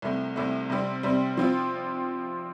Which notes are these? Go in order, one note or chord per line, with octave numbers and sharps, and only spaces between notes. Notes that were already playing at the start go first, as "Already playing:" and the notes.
C2 C3 A3
C2 C3 A3
C3 G3 C4
C3 G3 C4
F3 C4 F4